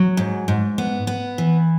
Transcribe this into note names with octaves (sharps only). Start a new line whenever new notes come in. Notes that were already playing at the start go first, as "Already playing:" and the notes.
Already playing: F#3
G#2
G#2
B3
B3
E3